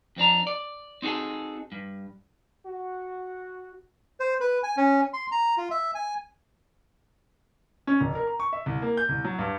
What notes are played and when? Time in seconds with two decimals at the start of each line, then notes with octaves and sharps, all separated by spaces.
0.17 F2 C4 D4 A#5
0.47 D5
1.02 C4 D#4 F#4 G#4 A4
1.72 G2
2.66 F#4
4.20 C5
4.40 B4
4.63 G#5
4.77 C#4
5.13 C6
5.32 A#5
5.57 F4
5.71 E5
5.95 G#5
7.87 C#4
8.01 F1
8.15 A#4
8.27 A#5
8.40 C#6
8.53 E5
8.66 C2
8.82 A#3
8.97 G6
9.09 C2
9.25 F#3
9.39 G2